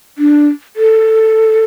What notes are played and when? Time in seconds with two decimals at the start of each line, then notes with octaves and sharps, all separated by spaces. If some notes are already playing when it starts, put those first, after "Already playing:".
0.18 D4
0.76 A4